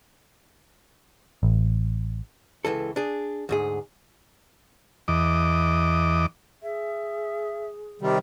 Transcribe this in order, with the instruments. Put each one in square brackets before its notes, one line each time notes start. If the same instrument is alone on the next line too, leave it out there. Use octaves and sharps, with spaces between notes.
[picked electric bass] A1
[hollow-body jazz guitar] C#2 F#2 E3 A4
D4 G#4
D2 G#2 G#4
[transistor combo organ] E2 D#5 D6
[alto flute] G#4 [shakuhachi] E5
[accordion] C3 D#3 G3 [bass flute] G4